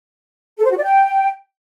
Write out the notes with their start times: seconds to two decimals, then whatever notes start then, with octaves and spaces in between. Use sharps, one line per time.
0.58 A4
0.64 C5
0.71 F#4
0.77 D5
0.83 G5